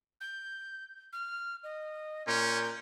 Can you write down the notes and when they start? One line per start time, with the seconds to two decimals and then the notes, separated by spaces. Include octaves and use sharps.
0.21 G6
1.13 F6
1.64 D#5
2.27 A#2 C#4 G6